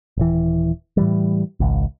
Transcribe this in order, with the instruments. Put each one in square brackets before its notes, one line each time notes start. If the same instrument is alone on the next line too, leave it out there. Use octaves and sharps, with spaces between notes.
[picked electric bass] D#1 E3
A2 E3 G3
G#1 C#2